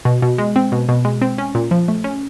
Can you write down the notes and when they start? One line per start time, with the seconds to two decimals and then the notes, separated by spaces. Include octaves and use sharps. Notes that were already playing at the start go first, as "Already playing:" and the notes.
0.05 B2
0.22 B2
0.38 G#3
0.56 C4
0.72 B2
0.89 B2
1.05 G#3
1.22 C4
1.38 C#4
1.55 A#2
1.71 F3
1.88 A3
2.04 C#4